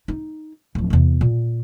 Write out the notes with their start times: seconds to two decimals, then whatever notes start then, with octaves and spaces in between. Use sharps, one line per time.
0.08 D#4
0.75 D1 F3
0.90 E2 C3
1.21 A#2